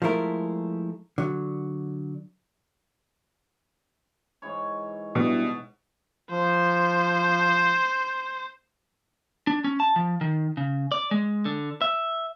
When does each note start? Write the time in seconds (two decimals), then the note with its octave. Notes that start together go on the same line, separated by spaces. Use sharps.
0.02 F3 G#3 A3 E4 A#4
1.18 D3 F#3
4.42 G#2 E3 C#5
5.15 B2 G3 D4 E4
6.31 F3 C5
9.47 D4
9.64 C#4
9.80 A5
9.96 F3
10.21 D#3
10.57 C#3
10.92 D5
11.11 G#3
11.45 D3
11.82 E5